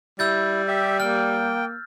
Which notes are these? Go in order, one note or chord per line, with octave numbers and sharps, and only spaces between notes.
G3 E4 E6 G6 A6
G4 E5
A#3 G5 F6